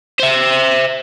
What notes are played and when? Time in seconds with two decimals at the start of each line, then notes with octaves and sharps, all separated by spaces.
0.19 C5 E5